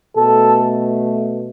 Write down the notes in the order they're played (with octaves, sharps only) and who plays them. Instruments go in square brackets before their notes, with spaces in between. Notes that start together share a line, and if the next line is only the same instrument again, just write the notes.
[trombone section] B2 A3 A4